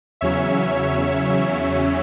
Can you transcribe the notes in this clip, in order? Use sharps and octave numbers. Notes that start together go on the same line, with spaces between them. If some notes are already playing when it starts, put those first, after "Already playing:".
E2 C#3 F#3 C#4 C#5 E5